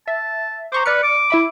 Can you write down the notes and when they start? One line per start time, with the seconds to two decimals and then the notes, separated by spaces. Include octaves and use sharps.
0.08 E5 A5
0.72 C5 A#5 C#6 D6
0.86 B4 D5 F6 C#7
1.03 D6
1.30 E4 E5 B5